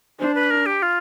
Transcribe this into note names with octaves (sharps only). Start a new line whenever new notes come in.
D4 C5
B4
A#4
G4
F4